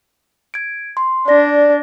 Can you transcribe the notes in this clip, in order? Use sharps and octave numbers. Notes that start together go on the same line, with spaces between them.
G#6 D7
C6
D4 D5 A#6